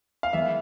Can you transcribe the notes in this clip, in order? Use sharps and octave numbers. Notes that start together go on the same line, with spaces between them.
F5
E3 G#3 B3 E5